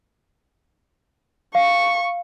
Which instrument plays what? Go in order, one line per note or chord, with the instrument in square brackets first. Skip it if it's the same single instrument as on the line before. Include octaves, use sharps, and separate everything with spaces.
[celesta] F5 [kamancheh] C#6